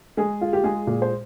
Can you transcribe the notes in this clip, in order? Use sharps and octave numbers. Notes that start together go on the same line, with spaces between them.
G#3 G#4
F4
G4
G#3 G#4
A#2
C5